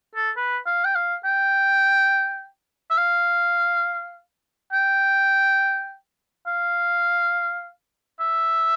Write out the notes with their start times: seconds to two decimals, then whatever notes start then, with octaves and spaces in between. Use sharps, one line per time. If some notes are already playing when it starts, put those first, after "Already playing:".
0.15 A4
0.37 B4
0.66 F5
0.85 G5
0.95 F5
1.24 G5
2.90 E5
2.98 F5
4.72 G5
6.47 F5
8.20 E5